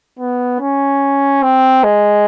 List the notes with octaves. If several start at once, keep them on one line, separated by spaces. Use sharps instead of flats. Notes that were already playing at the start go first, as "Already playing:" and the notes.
B3
C#4
C4
G#3